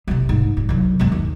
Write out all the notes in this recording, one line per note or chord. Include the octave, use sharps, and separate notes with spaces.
C3 G3
G#2
G2
C2 F#3
F#2 G#3
D#2